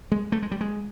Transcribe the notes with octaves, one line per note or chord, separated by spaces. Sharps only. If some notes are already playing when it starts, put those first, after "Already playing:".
G#3
A3
G#3
G3
G#3